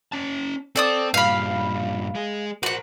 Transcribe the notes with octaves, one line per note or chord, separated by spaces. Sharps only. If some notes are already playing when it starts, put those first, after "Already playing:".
C#4 A5
C4 A4 D5 D#6
G2 A#2 F5 B5
G#3 G#4
F#4 A#4 C5 F#5